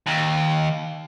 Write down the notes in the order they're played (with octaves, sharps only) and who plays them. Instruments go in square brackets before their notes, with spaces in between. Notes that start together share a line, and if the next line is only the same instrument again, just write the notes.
[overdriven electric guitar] D#2